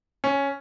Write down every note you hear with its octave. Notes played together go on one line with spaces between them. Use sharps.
C#4